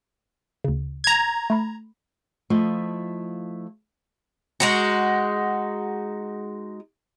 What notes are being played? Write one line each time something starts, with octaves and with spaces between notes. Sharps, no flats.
D2 C#3
A#5 G#6
A3 B5
F3 A3 E4 F4 D#5
G#3 D#4 F#4